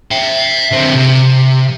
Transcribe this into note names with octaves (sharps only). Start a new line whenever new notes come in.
E5 G5
D3 C4
C3